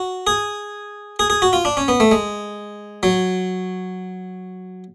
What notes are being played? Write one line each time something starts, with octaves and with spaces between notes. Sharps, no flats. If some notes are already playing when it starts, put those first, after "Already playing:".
Already playing: F#4
G#4
G#4
G#4
F#4
F4
D4
C#4
B3
A3
G#3
F#3